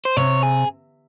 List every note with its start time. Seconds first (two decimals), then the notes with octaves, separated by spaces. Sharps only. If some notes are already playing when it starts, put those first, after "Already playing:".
0.05 C5
0.17 C3 C#5
0.43 G#4